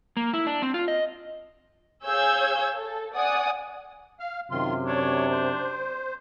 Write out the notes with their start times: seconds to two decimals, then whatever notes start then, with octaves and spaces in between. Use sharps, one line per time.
0.17 A#3
0.33 E4
0.47 D4
0.62 C4
0.74 F4
0.88 D#5
2.06 G#4 C#5 F5 E6 G6 G#6
2.75 A4
3.15 D5 F#5 G#5 D#6
4.20 F5 F6
4.51 F#2 C3 D#3 F4 C6
4.86 D4 C#5
5.31 C5